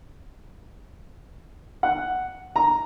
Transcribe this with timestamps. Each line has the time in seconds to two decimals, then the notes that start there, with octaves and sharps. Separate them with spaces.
1.83 F#5
2.56 A#5